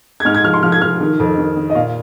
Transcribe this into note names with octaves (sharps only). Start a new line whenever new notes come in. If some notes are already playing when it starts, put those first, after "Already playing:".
G#6
G#2 F6
G#6
F3 F6
C6
F3 F6
G#6
F3 F6
D#3
F2
D#3
D#3
D#5
A#2 F5